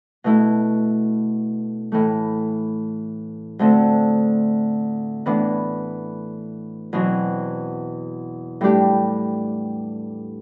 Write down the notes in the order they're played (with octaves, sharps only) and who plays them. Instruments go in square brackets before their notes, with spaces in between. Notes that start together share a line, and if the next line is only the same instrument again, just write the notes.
[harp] B2 A3 E4
A2 E3 A3
D2 D3 A3 C4
A2 E3 B3 D4
E2 B2 F#3 C4
A2 G3 D4 G4